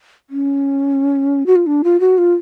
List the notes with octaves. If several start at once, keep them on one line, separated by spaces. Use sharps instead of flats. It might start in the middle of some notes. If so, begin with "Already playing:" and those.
C#4
F#4
F4
D4
F4
F#4
F4